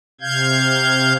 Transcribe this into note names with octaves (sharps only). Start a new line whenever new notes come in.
C3 F5 G6 G#6